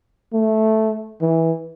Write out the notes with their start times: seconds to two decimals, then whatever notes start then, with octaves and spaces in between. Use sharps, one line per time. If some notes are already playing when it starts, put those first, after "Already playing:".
0.33 A3
1.21 E3